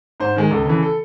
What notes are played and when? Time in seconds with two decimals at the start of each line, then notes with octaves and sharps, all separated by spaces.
0.20 G#2 C5
0.36 D#3 G#3
0.51 C#2 A4
0.66 C#3 E3
0.83 A4